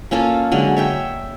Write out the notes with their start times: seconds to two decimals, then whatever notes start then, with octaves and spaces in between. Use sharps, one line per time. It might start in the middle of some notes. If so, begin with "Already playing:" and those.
0.11 A#3 C#4 F4 A4
0.52 D3 F#3 G#3
0.77 C#5 E5 G5